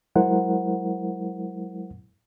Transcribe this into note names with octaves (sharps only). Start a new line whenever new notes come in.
F#3 G#3 E4 A#4 C5 F#5